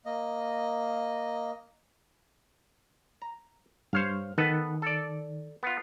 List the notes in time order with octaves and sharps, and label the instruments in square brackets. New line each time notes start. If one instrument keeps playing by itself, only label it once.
[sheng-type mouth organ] A#3 D#5
[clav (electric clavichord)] A#5
[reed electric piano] G2 F6 [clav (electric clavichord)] C5 C#5 F5
[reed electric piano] D#3 [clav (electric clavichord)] B3 A4 B4
[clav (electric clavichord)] A4 D5
B3 F4